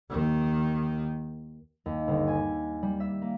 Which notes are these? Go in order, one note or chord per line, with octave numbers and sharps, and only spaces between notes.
D#2 D#3
D#2
G1
G#5
G3
E5
A#3